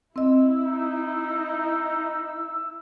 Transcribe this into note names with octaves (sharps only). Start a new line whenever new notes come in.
C4 E4 D#5 E6
D#4